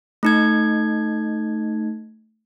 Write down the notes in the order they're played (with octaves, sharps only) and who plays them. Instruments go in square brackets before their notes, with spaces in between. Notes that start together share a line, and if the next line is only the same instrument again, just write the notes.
[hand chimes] A3 D#4 G#6